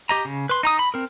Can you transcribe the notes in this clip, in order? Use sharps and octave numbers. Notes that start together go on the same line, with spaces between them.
G4 D#5 A#5
C#3
B4 C6
D#4 A#5 D#6
B5
C4 A#4